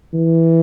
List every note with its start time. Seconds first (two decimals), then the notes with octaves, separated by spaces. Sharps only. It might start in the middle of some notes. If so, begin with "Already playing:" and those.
0.14 E3